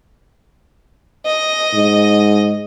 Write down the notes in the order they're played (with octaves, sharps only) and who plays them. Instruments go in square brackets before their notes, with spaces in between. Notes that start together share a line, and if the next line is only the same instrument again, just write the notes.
[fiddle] D#5
[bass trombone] G#2